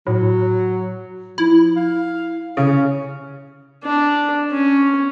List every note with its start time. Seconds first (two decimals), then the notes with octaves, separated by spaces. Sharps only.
0.07 A2 F#3
1.38 F3 E4
1.77 F5
2.57 C#3 C#4
3.84 D4
4.51 C#4